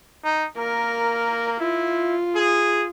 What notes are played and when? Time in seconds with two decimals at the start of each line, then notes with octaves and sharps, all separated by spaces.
0.24 D#4
0.58 A#3 A#4
1.60 E4 F4
2.36 G#4